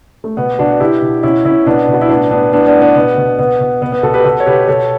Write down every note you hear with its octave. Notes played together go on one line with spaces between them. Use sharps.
A3
B2 B3
B2 D4 F#4
B2 E4 G4
B2
B2 C#4 E4
B2 C#4 E4
B2 B3 D4
B2
F#4
E4
A2 B3 D4
A2 B3 D4
A2 B3 D4
B3 D4
A2
B3 D4
B2 B3
B2
B2 B3
B2
B2 B3
B3
B2 F#4 A4
G4 B4
B2 F#4 A4
C#5
B2 G4 B4
B2 A4 C#5